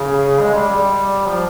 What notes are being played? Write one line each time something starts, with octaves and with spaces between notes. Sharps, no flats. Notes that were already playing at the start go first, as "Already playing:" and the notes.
Already playing: C#3
G#3
G3
G3
F3